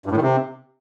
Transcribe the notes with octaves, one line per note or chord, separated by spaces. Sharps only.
G2
A2
D#3
C3